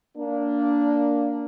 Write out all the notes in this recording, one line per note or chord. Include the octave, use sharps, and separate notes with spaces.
A#3 D4